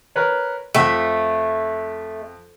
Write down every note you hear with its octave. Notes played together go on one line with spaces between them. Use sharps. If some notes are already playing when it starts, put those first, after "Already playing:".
A#4 B4 C#5
F2 A3 E5